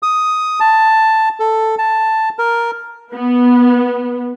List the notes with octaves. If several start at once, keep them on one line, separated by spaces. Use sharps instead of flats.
D#6
A5
A4
A5
A#4
B3